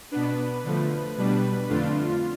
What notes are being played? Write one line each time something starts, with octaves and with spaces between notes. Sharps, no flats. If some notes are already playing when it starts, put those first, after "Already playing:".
B2 B3 D4 B4
D3 F3 A3
B2 G3 D4 B4
F2 D3 A3 D4 F4